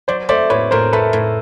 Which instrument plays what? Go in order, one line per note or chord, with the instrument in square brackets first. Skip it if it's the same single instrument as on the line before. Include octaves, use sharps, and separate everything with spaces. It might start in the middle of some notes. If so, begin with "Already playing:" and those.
[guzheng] F#3 [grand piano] C5 D5
[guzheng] A3 [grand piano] C5 D5
[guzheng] A2 [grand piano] B4 C#5
[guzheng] A2 [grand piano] A#4 C5
[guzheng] A3 [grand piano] A4 B4
[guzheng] A2